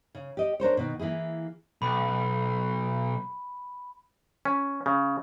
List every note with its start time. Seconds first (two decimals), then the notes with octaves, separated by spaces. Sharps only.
0.15 C#3
0.37 G4 D#5
0.60 D4 A#4 C5 C#5
0.77 B2 D#3
0.99 E3 A#3 E4 G#4
1.82 B1 B5
4.45 C#4
4.86 C#3